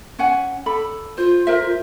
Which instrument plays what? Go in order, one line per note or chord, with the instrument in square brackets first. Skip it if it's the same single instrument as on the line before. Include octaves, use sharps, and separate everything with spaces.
[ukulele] C#4 F#5 G#5
D4 A4 B5
[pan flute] F4 [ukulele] C5
[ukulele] A#4 C5 E5